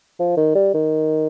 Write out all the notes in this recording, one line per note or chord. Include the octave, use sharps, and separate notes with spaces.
F3
D#3
G3
D#3